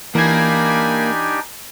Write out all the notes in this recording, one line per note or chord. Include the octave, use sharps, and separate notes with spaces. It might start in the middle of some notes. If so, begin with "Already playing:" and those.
E3 A#3 D4 D#4 G4 G#5 B5 G#6